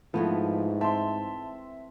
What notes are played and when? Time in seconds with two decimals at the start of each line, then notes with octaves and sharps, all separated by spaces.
0.14 G#2 E3 F3 A3 B3
0.81 C4 E5 A5 C6